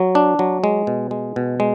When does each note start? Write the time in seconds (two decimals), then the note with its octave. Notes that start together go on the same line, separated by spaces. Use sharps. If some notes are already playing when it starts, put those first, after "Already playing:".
Already playing: F#3
0.15 D4
0.39 F#3
0.64 G#3
0.87 B2
1.11 G#3
1.36 B2
1.60 G#3